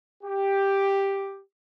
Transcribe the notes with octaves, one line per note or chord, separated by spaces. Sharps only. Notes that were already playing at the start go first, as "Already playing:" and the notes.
G4